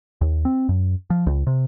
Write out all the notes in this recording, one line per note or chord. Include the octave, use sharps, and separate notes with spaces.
D#2
C4
F#2
F3
C#2
C3